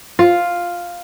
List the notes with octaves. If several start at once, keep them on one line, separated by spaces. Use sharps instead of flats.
F4